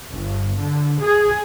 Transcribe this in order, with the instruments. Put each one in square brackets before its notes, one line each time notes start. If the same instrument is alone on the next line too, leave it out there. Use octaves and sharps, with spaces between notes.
[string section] G1
D3
G#4